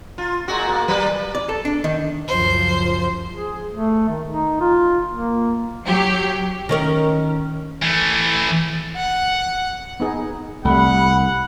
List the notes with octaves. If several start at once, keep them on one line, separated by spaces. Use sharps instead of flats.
F4
A#2 G#3 F#4
A#3
F#3 G3 B4
D5
A4
D4
D#3
C#2 F#2 F3 C5
G#4
A3
D#3
D#4
F4
A#3
F#3 G4
D#3 C#4 A#4
E3 A3
F#5
B3 D#4 G#4
C2 G3 A3 F#5 B5